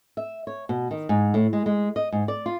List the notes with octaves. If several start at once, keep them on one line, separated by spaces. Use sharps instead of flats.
E5
C#5
B2
D#3
G#2
A2
G#3
G#3
D#5
G#2
D5
F4